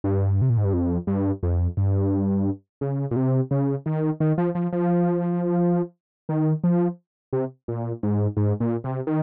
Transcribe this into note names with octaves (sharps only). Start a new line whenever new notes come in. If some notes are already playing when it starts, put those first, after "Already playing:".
G2
C3
A#2
G#2
G2
F2
G2
F2
G2
C#3
A#2
C3
C#3
D#3
D#3
F3
F3
F3
D#3
F3
C3
A#2
G#2
G#2
A#2
C3
D#3